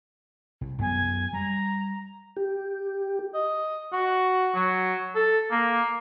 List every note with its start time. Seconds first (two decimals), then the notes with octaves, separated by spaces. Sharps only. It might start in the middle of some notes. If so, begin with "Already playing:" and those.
0.61 C2
0.81 F#2 B3 G#5
1.33 G3 A#5
2.37 G4
3.34 D#5
3.93 F#4
4.55 F#3
5.15 A4
5.51 A#3